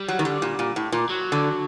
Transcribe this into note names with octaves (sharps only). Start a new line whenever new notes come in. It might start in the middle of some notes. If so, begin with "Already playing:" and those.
Already playing: G3
F#3
D#3
D3
A#2
A#2
A2
A#2
F#3
D3